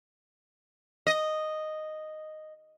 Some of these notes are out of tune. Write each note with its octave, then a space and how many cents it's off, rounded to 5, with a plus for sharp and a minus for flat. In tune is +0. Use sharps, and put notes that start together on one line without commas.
D#5 -5